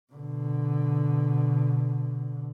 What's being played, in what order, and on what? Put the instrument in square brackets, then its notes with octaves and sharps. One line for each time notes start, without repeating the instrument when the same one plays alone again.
[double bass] B2 D3